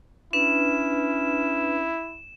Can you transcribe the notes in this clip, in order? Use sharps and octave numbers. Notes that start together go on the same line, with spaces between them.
C#4 D4 E4 B4 E7